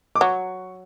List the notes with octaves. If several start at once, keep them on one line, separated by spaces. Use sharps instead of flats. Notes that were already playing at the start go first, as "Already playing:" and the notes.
D6
F#3 C#6